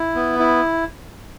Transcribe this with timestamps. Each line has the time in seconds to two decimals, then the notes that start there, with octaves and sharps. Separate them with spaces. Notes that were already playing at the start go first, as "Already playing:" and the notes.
Already playing: E4
0.15 B3
0.39 E4